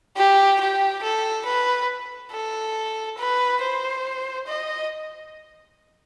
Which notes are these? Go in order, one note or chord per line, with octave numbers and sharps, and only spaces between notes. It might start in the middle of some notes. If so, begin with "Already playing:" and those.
G4
G4
A4
B4
A4
B4
C5
D#5